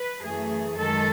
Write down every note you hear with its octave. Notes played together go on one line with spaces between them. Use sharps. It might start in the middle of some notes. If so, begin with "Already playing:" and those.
Already playing: B4
F#2 E3 A3 G#4
F#2 D#3 G#3 A4